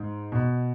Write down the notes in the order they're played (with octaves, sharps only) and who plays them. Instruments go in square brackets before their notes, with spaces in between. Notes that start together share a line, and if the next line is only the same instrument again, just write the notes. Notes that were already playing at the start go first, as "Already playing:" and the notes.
Already playing: [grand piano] G#2
B2